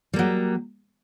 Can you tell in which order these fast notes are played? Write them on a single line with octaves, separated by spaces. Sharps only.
G3 A#3 F#3